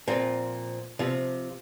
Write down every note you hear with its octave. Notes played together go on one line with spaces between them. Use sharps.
A#2 F3 C4
C3 F3